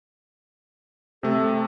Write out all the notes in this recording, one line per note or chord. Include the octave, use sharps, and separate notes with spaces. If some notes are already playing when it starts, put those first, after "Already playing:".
C3 A3 A4